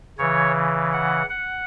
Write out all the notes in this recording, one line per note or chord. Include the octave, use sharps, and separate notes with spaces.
C#3 E3 C#5
F#5
F#5